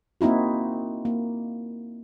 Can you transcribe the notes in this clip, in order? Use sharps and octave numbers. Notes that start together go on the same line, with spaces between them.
A#3 C4 D#4 E4 F#4
A#3